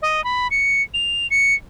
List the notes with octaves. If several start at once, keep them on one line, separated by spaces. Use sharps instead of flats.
D#5
B5
C#7
F7
C#7